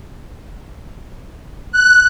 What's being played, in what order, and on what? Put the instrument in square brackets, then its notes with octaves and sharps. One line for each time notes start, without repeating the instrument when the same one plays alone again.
[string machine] F#6